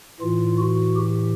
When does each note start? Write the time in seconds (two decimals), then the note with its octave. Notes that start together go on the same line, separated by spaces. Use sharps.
0.20 A2 E3 F4
0.58 F#4
0.96 G4